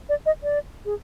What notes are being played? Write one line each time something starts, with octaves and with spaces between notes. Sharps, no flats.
D5
D#5
D5
G#4